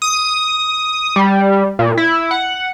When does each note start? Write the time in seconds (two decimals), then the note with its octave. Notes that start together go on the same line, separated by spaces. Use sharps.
0.02 D#6
1.16 G3
1.79 A#2
1.97 E4
2.31 F#5